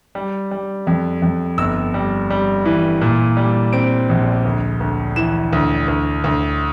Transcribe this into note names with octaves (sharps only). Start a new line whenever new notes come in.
G3
G3
F2
F2
G1 E6
G3
G3
E3
A#2
G3
C4 D7
A#1
D2
D2
E3 E7
D2
D2
D2